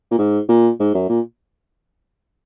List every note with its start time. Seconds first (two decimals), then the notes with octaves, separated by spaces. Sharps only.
0.11 A#2
0.18 G#2
0.49 A#2
0.80 G#2
0.94 F#2
1.09 A#2